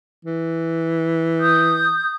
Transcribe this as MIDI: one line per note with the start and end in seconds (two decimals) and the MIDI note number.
0.25 2.02 52
1.39 2.15 87
1.39 2.15 91